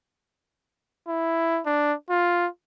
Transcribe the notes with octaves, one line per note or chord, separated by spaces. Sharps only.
E4
D4
F4